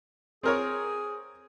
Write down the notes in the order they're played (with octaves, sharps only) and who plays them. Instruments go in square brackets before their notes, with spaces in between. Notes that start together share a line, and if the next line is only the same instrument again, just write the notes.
[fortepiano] C4 A#4 C#5 [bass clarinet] G#4